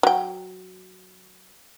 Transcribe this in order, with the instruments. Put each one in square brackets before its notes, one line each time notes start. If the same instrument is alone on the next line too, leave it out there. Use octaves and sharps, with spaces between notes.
[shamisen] F#3 G5